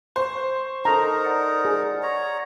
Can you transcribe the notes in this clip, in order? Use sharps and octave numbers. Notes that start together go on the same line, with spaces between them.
C5 C#6
D#4 A4 A#4 A#5
D5 F#5
G#4
C#5 A#5